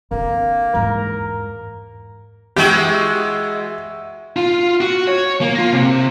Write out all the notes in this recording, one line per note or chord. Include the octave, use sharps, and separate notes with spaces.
D3 A#3 C4
E2 G#2 A#4
E3 G#3 F#4 G4
F4
F#4
C#5
A#3
F4
C3